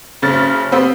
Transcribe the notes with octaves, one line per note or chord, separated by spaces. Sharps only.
F#1 C#3 A6
B3 C4 G4